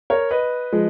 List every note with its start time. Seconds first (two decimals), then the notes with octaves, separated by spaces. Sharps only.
0.10 A#4 C#5
0.31 B4 D#5
0.72 F3 G#3